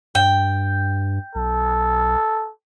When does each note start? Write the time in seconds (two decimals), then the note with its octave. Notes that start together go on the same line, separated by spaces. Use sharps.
0.15 G2 G5
1.35 B1 A4